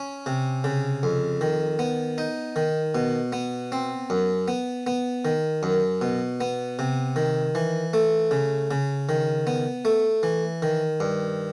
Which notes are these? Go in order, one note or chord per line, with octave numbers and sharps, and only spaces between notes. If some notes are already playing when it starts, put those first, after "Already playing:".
Already playing: C#4
C3
C#3
F2
D#3
B3
D#4
D#3
B2
B3
C4
F#2
B3
B3
D#3
F#2
B2
B3
C3
D#3
E3
A3
C#3
C#3
D#3
B3
A3
E3
D#3
G2